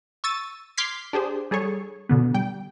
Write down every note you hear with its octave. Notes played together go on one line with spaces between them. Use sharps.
C#6 E6 A6 D#7
C6 D6 F6 G#6 B6 C7
D4 G4 G#4 C5
G3 G#4 A4 C#5
B2 D3 B3
G3 G5